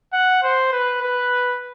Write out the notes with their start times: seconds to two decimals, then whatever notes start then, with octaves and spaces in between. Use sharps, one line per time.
0.13 F#5
0.43 C5
0.72 B4
1.02 B4